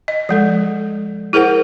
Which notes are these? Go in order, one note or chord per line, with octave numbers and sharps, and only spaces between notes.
D#5
F3 G#3 A4
E4 G#4 A#4 C5 F#5